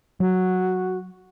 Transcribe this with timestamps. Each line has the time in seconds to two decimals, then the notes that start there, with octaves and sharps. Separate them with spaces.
0.20 F#3 F#4